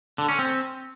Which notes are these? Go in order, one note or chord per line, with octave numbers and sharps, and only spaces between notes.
D3
C#4
C4